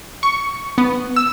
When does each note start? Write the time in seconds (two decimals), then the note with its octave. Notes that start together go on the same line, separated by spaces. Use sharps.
0.23 C#6
0.78 B3
1.16 E6